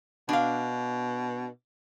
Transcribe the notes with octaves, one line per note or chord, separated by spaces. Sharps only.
B2 D4 F5